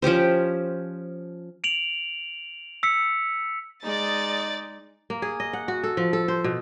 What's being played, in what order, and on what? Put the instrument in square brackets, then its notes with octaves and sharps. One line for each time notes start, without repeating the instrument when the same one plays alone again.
[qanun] F3 C#4 G4 C5
[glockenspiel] D7 F7 F#7
E6 B6 C#7
[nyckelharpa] G#3 D#4 [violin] D5 A6
[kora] A#3
G#4
D#5
F#5
F#4
A4
F3
A4
C5
B2